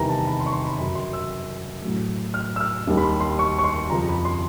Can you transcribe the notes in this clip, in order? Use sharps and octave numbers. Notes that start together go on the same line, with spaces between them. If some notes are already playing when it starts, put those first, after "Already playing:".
Already playing: E2 C3 D#3 G3 A#5
A5
B5
C6
C#6
C6
B5
F#2 C#3 F#3 B5
C6
E6
A2 F#3 A3
F6
E6
F6
D#2 D#3 G3
B5
C6
C6
C#6
C#6
C6
F2 C#3 F3 A#5
B5
C6